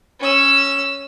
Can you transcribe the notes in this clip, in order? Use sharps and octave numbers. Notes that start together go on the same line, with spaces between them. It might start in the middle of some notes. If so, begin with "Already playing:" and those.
C#4 E6